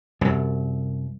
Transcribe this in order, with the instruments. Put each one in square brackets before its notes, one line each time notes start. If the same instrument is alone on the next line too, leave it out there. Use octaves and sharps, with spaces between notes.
[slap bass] C2 F#2